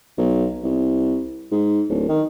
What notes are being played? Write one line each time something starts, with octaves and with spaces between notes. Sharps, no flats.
B1
C2
G#2
D1
D#3